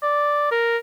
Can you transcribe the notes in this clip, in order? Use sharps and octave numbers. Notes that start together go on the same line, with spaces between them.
D5
A#4